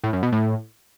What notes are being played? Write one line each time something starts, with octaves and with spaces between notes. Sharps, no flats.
A2
F#2
B2
A2